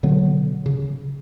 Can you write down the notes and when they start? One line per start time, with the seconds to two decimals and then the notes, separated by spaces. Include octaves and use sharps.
0.03 B2 D3 F#3 B3
0.66 C#3